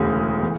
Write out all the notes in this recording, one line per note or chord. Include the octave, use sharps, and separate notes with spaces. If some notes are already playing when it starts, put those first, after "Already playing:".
Already playing: E1 D2 C#3 E3 A3
E3